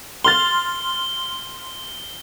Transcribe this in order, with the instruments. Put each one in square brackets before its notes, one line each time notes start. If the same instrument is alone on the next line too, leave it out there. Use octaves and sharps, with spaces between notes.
[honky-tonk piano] C6 F6 A6 [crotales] G7